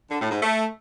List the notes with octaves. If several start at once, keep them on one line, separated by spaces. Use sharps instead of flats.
D3
A2
G#2
A3